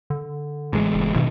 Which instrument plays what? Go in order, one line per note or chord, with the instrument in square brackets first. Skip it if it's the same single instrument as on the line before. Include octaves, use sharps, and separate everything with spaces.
[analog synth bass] D3
[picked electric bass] A1 G#3
[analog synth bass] F#1
[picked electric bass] G2 B2 D#3